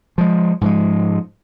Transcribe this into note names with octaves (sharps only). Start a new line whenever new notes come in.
F3 G#3
G#2 F3 G#3